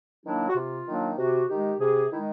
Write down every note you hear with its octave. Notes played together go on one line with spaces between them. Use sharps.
D#3 F#3 A#3 D4 E4
F#4
C3 F4
D#3 F#3 A#3 D4
C3 F#4
D#3 G#3 G4
C3 G#4
D#3 G#3 E4